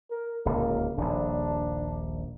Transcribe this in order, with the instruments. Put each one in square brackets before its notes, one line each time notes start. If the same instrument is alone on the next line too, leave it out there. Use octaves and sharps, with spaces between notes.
[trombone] A#4
[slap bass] D1 C#2 [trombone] A#3
[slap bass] D#1 A#1 [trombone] D4